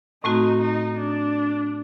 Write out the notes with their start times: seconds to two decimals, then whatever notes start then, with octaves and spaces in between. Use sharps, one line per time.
0.23 A2 A3 C4 D#4 F#4
0.61 D#4
0.98 D4